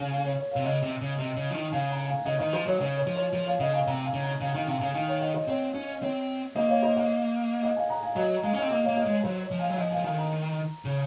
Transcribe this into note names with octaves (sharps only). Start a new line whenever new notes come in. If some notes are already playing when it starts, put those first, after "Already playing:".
Already playing: C#3
F5 G#5
C#5
C#5
C3 C#5 F5
C#3 D#5 F#5
C3
C#3
C3
C#3
F3
D#3
C#3 F5 G#5
F#5 A#5
F5 G#5
C#3 D#5 F#5
D#3 C5 D#5
F3 C5
F#3 C#5
C#3 C#5
C#5
F3
C#5
F3 C#5
C#5 F5
C#3 D#5 F#5
F5 G#5
C3 F#5 A#5
F5 G#5
C#3
F#5 A#5
C#3 F5 G#5
F#5
D#3 F5 G#5
C3 F5 G#5
C#3 F5 G#5
D#3 F5 G#5
C#5 F5
D#5 F#5
C5 D#5
C4 C#5
C#4
C4 C#5
A#3 C5 D#5
C#5 F5
C5 D#5
D#5 F#5
D#5 F#5
F5 G#5
F#5 A#5
F5 G#5
F#3 D#5 F#5
A#5
G#3 F5 G#5
C#4
D#5 F#5
C4
A#3 D#5 F#5
A#3 C#5 F5
C5 D#5
G#3 C#5
F#3 C5
C#5
F3
F5 G#5
F#3
F3 D#5 F#5
F5 G#5
F3
D#3 F5 G#5
F#5 A#5
C#3